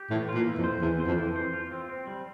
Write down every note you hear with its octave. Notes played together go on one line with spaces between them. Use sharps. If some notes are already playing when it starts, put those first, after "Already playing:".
Already playing: G4
A2 E3
F4
A#2
E3
F2
C5
E2 E3
C5
F2
E3
C5
F4
C4
C4
G3